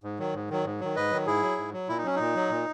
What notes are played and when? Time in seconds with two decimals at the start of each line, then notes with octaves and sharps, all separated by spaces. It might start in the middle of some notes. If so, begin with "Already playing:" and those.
0.04 G#2
0.19 D#3 F#3
0.34 G#2
0.50 D#3 F#3
0.65 G#2
0.80 D#3 F#3
0.96 G#2 B4 D#5
1.11 D#3 F#3
1.27 G#2 E4 G#4
1.42 F#3
1.58 G#2
1.73 F#3
1.88 A#2 E4
1.98 D#4
2.04 F#3 C#4
2.16 A#2 D#4
2.35 F#3
2.50 A#2